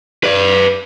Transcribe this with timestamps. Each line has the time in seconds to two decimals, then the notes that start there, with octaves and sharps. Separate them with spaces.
0.24 B4 D5